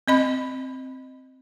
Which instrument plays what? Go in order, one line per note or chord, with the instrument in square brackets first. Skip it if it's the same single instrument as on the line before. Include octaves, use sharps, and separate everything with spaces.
[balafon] C4 D#5 B5